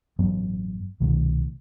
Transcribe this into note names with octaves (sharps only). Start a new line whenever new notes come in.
A1 G2 F#3 B3
C2 B2 D#3 A3